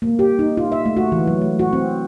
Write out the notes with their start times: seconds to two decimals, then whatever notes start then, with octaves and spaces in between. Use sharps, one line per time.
0.02 A#3
0.19 G4
0.39 D#4
0.57 F4
0.72 E5
0.86 A3
0.97 F#4
1.12 E3
1.27 F#3
1.42 A3
1.59 F#4
1.73 C4